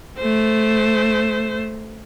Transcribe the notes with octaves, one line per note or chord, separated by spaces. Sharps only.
A3 C5